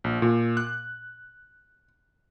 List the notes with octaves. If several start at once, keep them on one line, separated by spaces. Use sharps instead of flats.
A#1
A#2
F#6